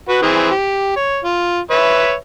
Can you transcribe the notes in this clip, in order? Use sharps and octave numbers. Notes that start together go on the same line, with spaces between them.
F#4 B4
E3 C4 G#4
G4
C#5
F4
B4 C#5 E5